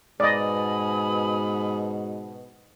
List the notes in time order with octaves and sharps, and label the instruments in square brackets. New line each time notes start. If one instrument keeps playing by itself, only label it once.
[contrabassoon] G#2 [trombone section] B2 [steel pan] D5 D#5 [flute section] G#5 B5 D#6